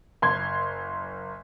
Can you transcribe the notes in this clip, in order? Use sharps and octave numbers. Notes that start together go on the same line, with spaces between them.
F#1 C6 G#6